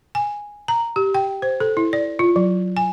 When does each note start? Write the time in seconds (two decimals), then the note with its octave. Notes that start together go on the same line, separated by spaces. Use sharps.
0.15 G#5
0.68 A#5
0.96 G4
1.14 G5
1.42 C5
1.60 A4
1.77 E4
1.93 D5
2.19 F4
2.36 F#3
2.77 G#5